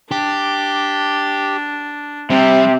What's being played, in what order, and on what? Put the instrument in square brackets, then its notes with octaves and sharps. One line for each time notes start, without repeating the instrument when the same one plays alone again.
[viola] D4 [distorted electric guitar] G4
[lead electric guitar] C3 [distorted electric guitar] G3 [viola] C4